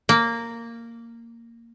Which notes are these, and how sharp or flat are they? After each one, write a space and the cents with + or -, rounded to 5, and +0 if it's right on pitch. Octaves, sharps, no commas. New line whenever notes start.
A#3 -10